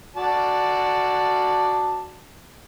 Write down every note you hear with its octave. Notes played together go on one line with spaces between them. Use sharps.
F#4 D5 A5